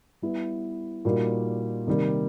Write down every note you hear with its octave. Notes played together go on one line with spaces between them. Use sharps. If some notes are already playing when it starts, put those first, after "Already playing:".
G3 B3 E4
A#2 G3 A#3 D#4 F#4
C3 D#3 G3 A#3